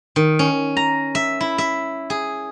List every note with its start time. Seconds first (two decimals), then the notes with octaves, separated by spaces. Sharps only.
0.16 D#3
0.39 C#4
0.77 A#5
1.15 E5
1.41 E4
1.58 E5
2.10 G#4